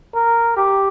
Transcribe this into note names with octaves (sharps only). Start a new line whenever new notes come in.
A#4
G4